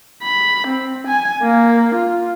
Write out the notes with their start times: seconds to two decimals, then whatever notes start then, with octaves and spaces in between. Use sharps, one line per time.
0.23 B5
0.67 C4
1.07 G#5
1.42 A#3
1.94 F4